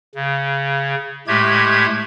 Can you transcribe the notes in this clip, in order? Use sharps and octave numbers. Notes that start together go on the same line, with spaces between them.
C#3
A2 G#3 A3 G4 G#6